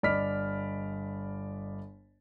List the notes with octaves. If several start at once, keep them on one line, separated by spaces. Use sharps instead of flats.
G1 D5 D#5 B5 F6 B6